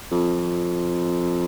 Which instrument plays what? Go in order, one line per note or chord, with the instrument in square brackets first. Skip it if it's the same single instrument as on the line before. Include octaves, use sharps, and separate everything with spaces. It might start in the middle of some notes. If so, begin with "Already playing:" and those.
[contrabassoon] F2